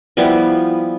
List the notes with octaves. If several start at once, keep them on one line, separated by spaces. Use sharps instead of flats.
F3 G3 B3 E4